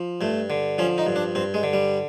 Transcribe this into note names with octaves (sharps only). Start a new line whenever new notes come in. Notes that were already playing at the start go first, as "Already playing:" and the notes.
Already playing: F3
G2 A3
D3
F3 C#4
D#4
G2
D4
G2 C4
G#3
D3
G3